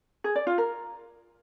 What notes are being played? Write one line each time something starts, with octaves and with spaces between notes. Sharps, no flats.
G#4
D5
F4
A#4